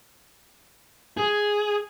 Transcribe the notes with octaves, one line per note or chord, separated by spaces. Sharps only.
G#4